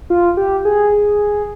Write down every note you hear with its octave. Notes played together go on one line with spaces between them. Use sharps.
F4
G4
G#4